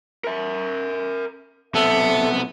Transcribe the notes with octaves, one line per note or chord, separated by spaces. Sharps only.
A#4 E5
B1 C3 B3 A4 E5